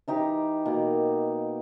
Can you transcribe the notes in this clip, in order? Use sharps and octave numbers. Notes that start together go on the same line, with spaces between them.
E3 D#4 G4
B2 A#3